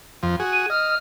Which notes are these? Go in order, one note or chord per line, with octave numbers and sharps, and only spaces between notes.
F2 F3
F#4 G#4
D#7
D#5 F6